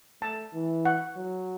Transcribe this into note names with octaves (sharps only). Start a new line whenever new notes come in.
A3 A5
E3
F#5
F#3